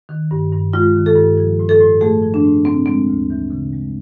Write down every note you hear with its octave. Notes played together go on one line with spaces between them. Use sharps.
D#3
G2
G2
G#3 F4
D#3
A4
G2
F3
A2
A4
A2
A3 G#4
F3
D4
A2
C#3 C4
G#3 C4
D2
E3
C#3
G#3